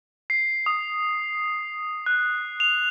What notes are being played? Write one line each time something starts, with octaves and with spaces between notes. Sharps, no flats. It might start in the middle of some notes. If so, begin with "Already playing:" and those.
C7
D#6
F#6
F7